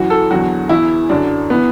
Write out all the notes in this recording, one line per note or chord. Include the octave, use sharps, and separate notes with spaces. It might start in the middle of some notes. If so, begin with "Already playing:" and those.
Already playing: F#2 E3 F#4
A4
E2 D3 F#3 F#4
E2 E3 E4
F#2 D3 F#3 D4
E3 B3